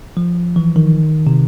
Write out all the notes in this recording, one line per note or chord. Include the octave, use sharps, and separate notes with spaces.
F3
E3
D#3
C3